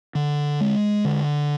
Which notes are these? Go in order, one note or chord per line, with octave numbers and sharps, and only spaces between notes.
D3
G#3
D3